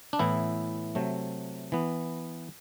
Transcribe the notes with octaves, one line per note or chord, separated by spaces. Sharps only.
D4
A2 E3 B3 E4
C3 F#3 A3
E3 B3